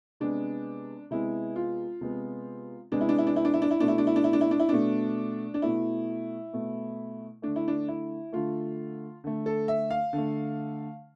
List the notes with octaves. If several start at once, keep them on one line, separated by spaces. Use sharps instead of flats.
C3 G#3 B3 D4
C3 G#3 B3 E4
F4
C3 G#3 B3
C3 G#3 B3 D4
E4
D4
E4
D4
E4
D4
E4
D4
E4
B2 A3 D4
E4
D4
E4
D4
E4
D4
E4
D4
E4
B2 A3 D4
D4
B2 A3 E4
B2 A3
D3 A3 D4
E4
D4
E4
D3 A3 F4
D3 A3
A4
E5
F5
D3 A3